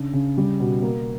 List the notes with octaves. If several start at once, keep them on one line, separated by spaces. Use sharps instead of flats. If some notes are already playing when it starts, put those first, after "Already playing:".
Already playing: C#3 D4
C#3
G3
B2
A#3